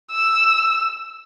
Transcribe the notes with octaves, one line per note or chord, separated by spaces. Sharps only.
E6